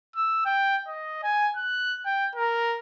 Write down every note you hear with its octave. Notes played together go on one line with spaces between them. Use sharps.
E6
G5
D#5
G#5
F#6
G5
A#4